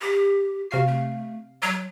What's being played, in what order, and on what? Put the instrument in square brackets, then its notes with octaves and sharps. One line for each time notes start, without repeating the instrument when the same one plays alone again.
[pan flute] G4
[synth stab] C3 F5 C7 [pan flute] F#4
[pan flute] A3
F#3